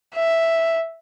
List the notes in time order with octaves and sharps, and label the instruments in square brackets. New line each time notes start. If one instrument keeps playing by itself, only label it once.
[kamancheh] E5